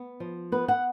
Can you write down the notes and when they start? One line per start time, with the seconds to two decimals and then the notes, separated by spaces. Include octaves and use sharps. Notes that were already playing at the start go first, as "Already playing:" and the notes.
Already playing: B3
0.20 F3
0.52 B3 B4
0.68 F#5